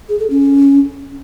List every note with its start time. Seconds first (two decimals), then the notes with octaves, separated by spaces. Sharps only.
0.09 G#4
0.20 A4
0.30 C#4